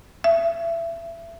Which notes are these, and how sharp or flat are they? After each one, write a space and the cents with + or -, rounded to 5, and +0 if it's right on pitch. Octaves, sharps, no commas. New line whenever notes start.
E5 +25